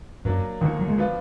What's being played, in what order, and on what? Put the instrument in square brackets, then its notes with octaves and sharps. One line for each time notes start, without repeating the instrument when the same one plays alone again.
[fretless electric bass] F#2 [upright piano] F#3 A#3 D4
[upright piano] D#2 D3 F3 A#3 [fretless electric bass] D#3
[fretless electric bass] F#3
G#3
[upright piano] F3 B3 D4 F4